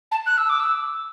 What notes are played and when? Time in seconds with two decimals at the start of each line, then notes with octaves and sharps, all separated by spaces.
0.11 A5
0.26 F#6
0.38 E6
0.49 D6
0.60 E6